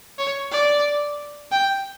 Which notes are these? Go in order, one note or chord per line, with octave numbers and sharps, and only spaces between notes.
C#5
D5
G5